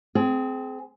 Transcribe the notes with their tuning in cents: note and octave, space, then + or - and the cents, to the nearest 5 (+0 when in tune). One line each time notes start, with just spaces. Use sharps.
C4 -15 G#4 +25